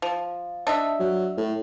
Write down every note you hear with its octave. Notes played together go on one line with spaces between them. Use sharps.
F3
D4 D#5 E5
F#3
A2